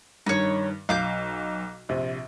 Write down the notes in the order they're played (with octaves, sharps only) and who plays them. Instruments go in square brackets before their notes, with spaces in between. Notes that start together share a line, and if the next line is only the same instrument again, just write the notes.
[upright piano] G2 D#3 [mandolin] D#4 C#5
[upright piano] B1 [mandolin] F5 D6 G6
[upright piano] A#1 C3